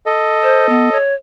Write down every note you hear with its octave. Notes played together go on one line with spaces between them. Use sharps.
A4 D#5
C5
B3
C#5